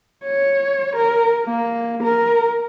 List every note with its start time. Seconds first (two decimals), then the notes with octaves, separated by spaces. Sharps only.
0.24 C#5
0.96 A#4
1.45 A#3
2.03 A#4